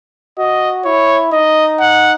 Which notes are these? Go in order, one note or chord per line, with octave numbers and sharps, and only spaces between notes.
F#4 D#5
E4 C#5
D#4 D#5
F#5